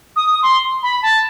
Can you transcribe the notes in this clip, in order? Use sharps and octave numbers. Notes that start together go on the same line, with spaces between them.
D#6
C6
B5
A5